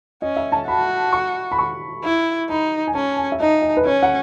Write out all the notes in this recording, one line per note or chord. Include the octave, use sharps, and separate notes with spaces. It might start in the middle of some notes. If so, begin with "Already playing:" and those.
C#4 D#5
E5
A5
F#4 B5
C#6
B5
C#6
E4
D#4 B5
G#5
C#4 A5
G#5
E5
D#4 D#5
D#5
B4
C#4 C#5
F#5